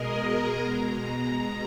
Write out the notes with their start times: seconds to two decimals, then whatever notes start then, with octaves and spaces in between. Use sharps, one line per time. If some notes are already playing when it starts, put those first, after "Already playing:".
Already playing: B2 G#3 G#4 A#4 D#5
0.17 A#5
0.58 B2 G#3
0.98 A#5